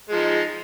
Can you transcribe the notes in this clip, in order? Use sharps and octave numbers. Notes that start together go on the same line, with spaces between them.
F3 G#3 D#4